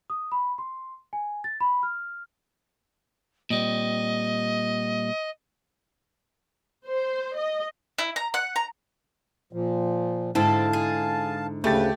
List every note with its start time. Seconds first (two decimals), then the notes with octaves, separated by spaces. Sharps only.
0.10 D#6
0.32 B5
0.58 C6
1.13 G#5
1.44 A6
1.60 B5
1.83 F6
3.50 A#2 G3 C4 D#5
6.87 C5
7.37 D#5
7.98 E4
8.16 A#5
8.34 F#5
8.56 A#5
9.53 A#2 F3
10.35 G#2 D3 C4 E4 A4 F5 A5
10.73 G#4
11.64 D2 C#3 A3 G4 B4 A6